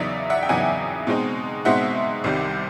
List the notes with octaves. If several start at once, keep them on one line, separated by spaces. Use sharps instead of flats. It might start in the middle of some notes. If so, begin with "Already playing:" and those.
Already playing: E2 C#3 F#3 B3 D#4 D5 E5
E5 F#5
G5
E2 C#3 F#3 B3 D#4 F#5 G#5
B2 G#3 C4 D#4
B2 G#3 C4 D#4 E5 F#5
C2 C3 D#3 G3